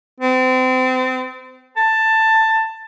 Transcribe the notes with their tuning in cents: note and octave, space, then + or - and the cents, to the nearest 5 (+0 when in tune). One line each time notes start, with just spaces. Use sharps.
C4 -30
A5 +10